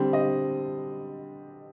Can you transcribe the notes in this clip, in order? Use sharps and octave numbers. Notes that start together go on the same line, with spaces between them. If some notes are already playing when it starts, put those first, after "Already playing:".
Already playing: D3 G3 C4
D#5